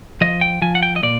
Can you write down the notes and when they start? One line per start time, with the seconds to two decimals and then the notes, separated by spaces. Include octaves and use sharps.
0.21 F3 D#5
0.41 G5
0.62 F3 G#5
0.75 F#5
0.83 G5
0.96 D#5
1.03 A#2 D5